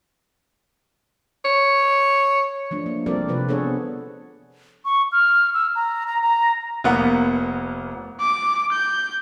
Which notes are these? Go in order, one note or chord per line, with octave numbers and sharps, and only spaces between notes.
C#5
F3 A3 D4
A#3
F3 G3 C4 A4 A#4 D5
C3 F3 B4
B3 D4 G#4 A4 C#5
C#6
F6
E6
A#5
A#5
A#5
F1 A#3 B3 F#5
D6
G6